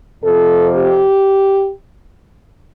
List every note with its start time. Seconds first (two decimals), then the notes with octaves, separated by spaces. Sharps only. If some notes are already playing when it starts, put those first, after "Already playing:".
0.22 F2 C3 F3 A4
0.75 G4